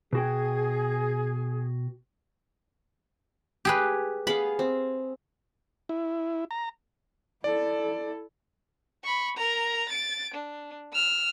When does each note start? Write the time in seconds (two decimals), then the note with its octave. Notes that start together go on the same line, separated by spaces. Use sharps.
0.13 B2 F#4 G#4 G5
3.65 G4 G#4 B4
4.27 B3 G#4 F5 B5
4.59 C4
5.89 E4
6.51 A#5
7.44 E4 A4 D5
9.03 B5 C#6
9.36 A#4 A#5
9.89 A6 D7
10.34 D4
10.93 E6 F6